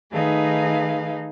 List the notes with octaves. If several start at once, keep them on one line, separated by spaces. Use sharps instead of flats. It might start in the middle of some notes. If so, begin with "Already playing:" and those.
D#3 A3 D#4 G#4 B4 F5